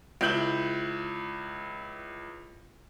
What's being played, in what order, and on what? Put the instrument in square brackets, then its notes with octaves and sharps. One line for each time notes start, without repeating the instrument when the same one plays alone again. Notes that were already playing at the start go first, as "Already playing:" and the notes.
[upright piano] C#2 E4 G6 F#7